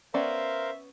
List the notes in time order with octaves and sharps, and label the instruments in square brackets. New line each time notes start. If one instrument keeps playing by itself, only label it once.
[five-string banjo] B3 C#4 D5 [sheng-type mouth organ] A#4 C5 F5 [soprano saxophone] E5